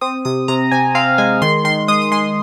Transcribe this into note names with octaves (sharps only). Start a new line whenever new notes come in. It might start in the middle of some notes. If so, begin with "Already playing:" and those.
C4 D#6
C3 D#6
C3 A#5
C3 G#5
C4 F5
G#3 G#5
D#3 C6
D#3 C6
G#3 D#6
D#6
G#3 C6